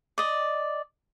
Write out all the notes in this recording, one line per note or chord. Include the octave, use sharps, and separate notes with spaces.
D5 D#5